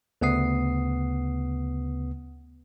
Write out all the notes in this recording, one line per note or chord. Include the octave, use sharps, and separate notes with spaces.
D2 C#3 B3 F#5 D#6 C7